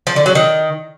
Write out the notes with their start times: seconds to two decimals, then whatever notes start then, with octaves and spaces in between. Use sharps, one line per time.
0.07 F3
0.16 D3
0.26 F#3
0.35 D#3